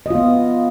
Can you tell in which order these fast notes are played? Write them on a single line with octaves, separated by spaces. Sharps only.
D#5 F4 B3